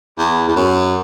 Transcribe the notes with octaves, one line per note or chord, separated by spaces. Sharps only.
E2
E2
F#2